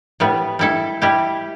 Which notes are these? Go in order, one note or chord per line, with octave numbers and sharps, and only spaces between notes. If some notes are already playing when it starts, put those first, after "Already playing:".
A2 G3 B3
G3 E4 A4
G3 E4 G4